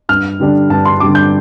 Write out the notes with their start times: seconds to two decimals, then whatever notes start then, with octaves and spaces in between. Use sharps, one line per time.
0.09 G2 F6
0.40 D3 G3 D4
0.70 G2 A5
0.85 C6
1.00 D3 G3 D4 D6
1.15 G6